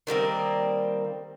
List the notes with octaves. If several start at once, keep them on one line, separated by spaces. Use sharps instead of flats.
D#3 G3 A#3 C4